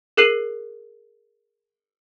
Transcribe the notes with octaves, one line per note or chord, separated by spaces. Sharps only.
G#4 A#4 F#6 C7 D#7 F#7